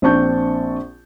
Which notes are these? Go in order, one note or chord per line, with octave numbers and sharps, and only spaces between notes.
A#1 C4 D4 A5 C#6 G6